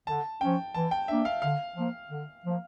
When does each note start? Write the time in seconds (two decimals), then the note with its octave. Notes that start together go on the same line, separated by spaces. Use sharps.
0.07 D3 A5
0.41 F3 C#4 G5
0.74 E3 A5
0.91 G5
1.08 A#3 D4 E5
1.25 F5
1.42 D3 F5
1.76 F3 A#3
2.10 D3
2.43 F3 A#3